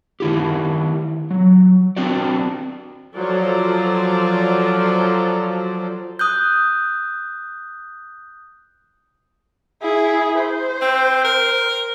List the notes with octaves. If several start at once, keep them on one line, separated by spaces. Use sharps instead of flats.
D#3 E4 G4
F#3
C4 D4 F#4 D5
F3 F#3 F4 A4 C5 D5
D#6 F#6 G6
E4 G#4
C5
C4
A#4